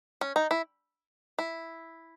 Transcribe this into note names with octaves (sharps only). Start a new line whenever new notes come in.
C#4
D#4
E4
E4